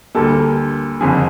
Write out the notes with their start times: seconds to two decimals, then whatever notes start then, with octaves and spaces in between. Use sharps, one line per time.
0.15 D2 D3 G3 A#3 A4
1.01 F#1 F2 D3 G#4